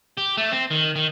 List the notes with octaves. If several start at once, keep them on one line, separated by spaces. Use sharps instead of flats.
G4
A3
C4
D#3
D#3